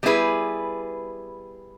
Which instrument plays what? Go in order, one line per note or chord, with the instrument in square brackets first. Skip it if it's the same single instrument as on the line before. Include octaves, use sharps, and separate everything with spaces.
[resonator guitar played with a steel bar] G3 B3 E4 G#4 B4